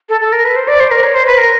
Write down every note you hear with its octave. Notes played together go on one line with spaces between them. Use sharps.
A4
A4
A#4
B4
C5
D5
C5
A#4
C#5
C5
B4
A#4